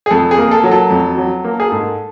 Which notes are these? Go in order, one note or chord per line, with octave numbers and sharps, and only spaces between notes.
G#4
F2 A4
G#4
A#3
A4
F#3
A4
F2
F#3
A#3
G#4
G#2 A4